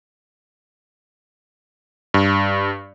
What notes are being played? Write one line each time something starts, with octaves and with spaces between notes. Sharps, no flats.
G2